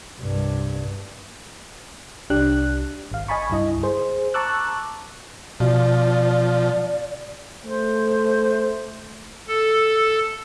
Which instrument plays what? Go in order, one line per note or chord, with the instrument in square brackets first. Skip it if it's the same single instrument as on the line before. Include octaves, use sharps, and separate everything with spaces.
[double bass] C2 G2
[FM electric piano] C2 D4 G4 F#6
G#1 F5
D#5 G#5 A5 B5 C#6
C#2 G2 E4 D#5
G#4 C5
A5 A#5 C#6 D6 E6 F#6
[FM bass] B2 [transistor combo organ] F3 [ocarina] D5
[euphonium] A3 [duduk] C5
[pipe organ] A4